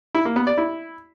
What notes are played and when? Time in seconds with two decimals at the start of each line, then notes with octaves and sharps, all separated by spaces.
0.15 E4
0.25 A#3
0.36 B3
0.47 D5
0.58 E4